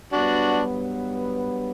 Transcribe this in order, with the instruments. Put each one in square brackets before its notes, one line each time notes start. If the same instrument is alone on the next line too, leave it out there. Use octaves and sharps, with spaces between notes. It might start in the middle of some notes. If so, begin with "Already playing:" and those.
[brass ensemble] G2 F#3 B3 [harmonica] D4 F#4